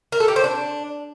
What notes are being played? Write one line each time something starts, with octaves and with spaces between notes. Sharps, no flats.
A#4
A4
G4
C5
D4